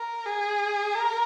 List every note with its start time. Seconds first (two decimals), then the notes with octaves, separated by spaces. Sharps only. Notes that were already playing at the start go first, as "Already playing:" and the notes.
Already playing: A#4
0.26 G#4
0.95 A#4